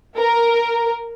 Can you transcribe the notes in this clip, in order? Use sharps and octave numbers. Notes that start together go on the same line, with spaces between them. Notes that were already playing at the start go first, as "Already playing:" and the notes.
A#4